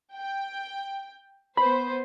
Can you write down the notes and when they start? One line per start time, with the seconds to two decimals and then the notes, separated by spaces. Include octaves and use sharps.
0.13 G5
1.57 B3 B4 C5 B5